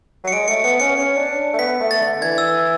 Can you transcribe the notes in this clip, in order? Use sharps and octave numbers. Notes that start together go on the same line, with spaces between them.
F#3
C#7
G#3 D7
A3 C#7
B3 C#7
C#4 C#7
C#4
D4
A3
B3 B6
A3
A6
D3
E3 G#6
E6